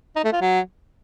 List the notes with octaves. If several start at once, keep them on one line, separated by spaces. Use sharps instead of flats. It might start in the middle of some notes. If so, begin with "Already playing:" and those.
D#4
A3
F4
F#3